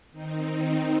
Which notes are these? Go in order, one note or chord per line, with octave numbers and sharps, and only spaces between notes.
D#3 C4 D#4